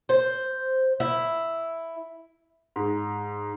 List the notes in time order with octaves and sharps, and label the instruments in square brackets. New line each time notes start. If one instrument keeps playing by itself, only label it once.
[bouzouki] C5
E4
[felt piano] G#2